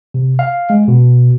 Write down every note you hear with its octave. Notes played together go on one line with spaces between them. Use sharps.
C3
F5
G#3
B2